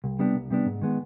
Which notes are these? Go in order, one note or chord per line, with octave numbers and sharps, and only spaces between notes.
C2
C3 G3 B3 D4
C2
C3 G3 B3 D4
G#2
D#3 G#3 B3